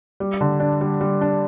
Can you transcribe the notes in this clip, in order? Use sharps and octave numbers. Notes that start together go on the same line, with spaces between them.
G3
D3
D4
G3
G3
D4